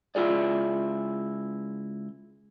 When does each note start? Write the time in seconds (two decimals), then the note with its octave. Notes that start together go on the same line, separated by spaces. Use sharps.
0.15 C#2 E4 F4 G#4 D5